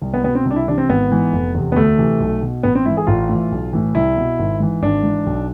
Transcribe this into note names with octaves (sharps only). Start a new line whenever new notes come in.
C2
B3
B2 B3
C4
C2
D4
E4
C3 E3 D4
C4
G#1 B3
G#2 E3
F1
E2 C3
B3
D2 A3
C3 E3
B1
B2
A1 B3
C4
G#2 E3 E4
G#4
A1 F4
A2
E3
B1
A2 E3
C2 E4
B2
G#1
G#2 E3
G#1 D4
G#2 E3
B1